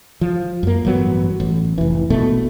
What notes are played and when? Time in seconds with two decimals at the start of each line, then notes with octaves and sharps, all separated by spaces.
0.21 F3
0.63 F#2 A#3
0.85 A1 G2 F#3 B3
1.40 A1
1.78 F1 E3
2.10 A#1 B2 A3